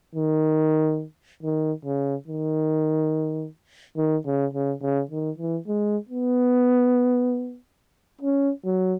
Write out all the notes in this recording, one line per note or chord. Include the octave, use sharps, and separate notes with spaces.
D#3
D#3
C#3
D#3
D#3
C#3
C#3
C#3
D#3
E3
G#3
B3
C#4
F#3